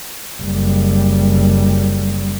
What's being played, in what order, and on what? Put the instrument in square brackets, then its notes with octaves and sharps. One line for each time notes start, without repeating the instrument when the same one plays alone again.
[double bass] F#1 G3